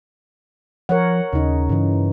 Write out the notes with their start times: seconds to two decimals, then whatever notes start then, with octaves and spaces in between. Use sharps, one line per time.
0.89 F3 A#4 C#5 F#5
1.33 D#2 C#3 D#4
1.69 G2 C#3 E3